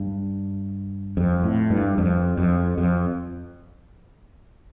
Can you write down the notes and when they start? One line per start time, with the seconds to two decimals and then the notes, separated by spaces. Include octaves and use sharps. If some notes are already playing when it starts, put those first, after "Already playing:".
Already playing: G2
1.17 F2
1.44 A2
1.70 G2
1.98 F2
2.37 F2
2.78 F2